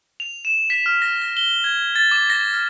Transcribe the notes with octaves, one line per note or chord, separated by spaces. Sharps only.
F7
E7
B6
F6
A#6
A#6
G7
G#6
A6
D6
A#6
F6